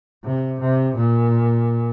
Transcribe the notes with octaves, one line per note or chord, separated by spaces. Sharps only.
C3
C3
A#2